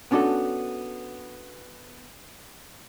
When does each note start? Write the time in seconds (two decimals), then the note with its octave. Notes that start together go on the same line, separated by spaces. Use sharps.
0.11 B3 C#4 D4 F4 F#4 A4